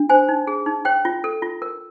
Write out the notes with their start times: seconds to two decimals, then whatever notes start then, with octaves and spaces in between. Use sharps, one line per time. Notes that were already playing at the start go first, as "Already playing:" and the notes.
Already playing: D4
0.09 C5 G#5
0.29 D#4
0.47 G#4
0.66 D#4
0.85 C#5 G5
1.05 F4
1.24 A4
1.42 F4
1.62 A#4